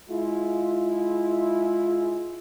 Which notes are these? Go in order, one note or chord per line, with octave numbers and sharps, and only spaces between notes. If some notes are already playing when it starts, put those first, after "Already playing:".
G#3 E4 F4